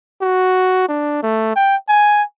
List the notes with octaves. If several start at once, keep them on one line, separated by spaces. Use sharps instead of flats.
F#4
D4
A3
G5
G#5